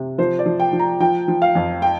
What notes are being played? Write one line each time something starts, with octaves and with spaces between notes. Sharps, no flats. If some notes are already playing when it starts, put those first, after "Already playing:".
Already playing: C3
F3 C5
D5
F3
G5
F3
A#5
F3 G5
F3
F5
F2
G5